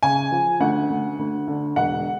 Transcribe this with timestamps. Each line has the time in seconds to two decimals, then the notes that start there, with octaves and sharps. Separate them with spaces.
0.03 C#3 G#5
0.31 F3
0.60 D2 F#5
0.90 D2
1.19 D2
1.48 D3
1.76 E1 F#5